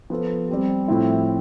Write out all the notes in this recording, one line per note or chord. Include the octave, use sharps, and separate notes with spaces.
F3 B3 F4 A4
G3 C4 G4
A2 F3 C4 E4